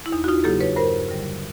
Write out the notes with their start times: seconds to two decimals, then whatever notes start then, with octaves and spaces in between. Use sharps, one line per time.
0.06 E4
0.12 E2 D#4
0.24 F#4
0.28 D#4 F4
0.44 C#3 F#3 A#3 G4 A4
0.60 B4 C#5
0.76 G2 A#4 C5
1.09 D3 G3